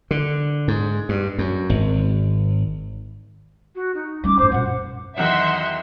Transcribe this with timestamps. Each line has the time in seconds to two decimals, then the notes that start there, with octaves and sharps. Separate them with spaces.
0.11 D3
0.68 G#2
1.09 G2
1.38 F#2
1.69 G#1
3.75 F#4
3.94 D#4
4.24 G3 C#4 D6
4.38 A1 F#2 C5
4.52 F#2 A#2 F#5
5.18 B1 E2 D#3 D#5 E5 F#5 C6